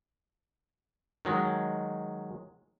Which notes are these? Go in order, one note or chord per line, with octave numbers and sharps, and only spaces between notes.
D#3 F#3 G#3